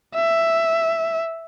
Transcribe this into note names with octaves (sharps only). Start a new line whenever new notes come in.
E5